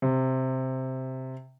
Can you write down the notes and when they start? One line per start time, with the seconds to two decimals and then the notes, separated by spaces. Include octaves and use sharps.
0.02 C3